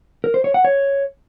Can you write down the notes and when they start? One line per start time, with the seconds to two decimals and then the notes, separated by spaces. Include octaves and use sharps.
0.24 A#4
0.34 C5
0.44 C#5
0.54 F#5
0.65 C#5